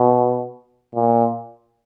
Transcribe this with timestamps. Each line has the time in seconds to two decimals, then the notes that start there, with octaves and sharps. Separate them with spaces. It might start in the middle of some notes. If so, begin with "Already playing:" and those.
Already playing: B2
0.95 A#2